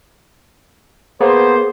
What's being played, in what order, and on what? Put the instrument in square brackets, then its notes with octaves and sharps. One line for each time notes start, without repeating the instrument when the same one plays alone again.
[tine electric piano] A#3 B3 [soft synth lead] G#4 [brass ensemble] C5